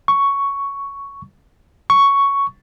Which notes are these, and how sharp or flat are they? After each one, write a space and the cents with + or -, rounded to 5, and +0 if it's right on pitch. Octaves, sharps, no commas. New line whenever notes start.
C#6 +5
C#6 +5